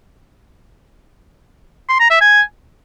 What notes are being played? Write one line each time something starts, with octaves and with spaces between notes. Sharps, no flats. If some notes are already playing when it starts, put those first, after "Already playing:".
C6
A#5
E5
G#5